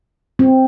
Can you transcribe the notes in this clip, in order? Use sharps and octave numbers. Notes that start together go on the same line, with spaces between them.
C4